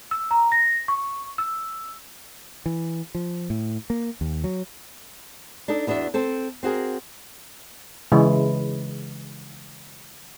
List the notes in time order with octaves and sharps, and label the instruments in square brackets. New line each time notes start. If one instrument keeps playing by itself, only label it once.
[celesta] E6
A#5
A#6
C#6
E6
[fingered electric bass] E3
F3
A2
A#3
D#2
F#3
[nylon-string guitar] D4 D#4 A4 D#5
E2 B3 D4 F#4 E5
C4 A4 C5
C4 F#4 G#4 A#4
[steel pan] C#3 E3 G#3